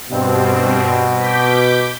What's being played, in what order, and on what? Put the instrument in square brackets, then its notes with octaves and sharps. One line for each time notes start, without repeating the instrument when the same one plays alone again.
[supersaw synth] G2 C4 [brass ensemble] B2
[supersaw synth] D6 G6 B6